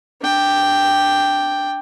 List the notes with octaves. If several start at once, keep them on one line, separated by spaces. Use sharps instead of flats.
D4 G5